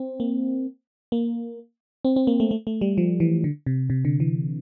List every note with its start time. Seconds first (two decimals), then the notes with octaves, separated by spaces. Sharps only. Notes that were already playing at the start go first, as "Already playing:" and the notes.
Already playing: C4
0.20 A#3
1.12 A#3
2.05 C4
2.16 C4
2.27 A#3
2.40 A3
2.51 A3
2.67 A3
2.81 G3
2.98 F3
3.20 E3
3.44 D3
3.66 C3
3.90 C3
4.05 D3
4.20 E3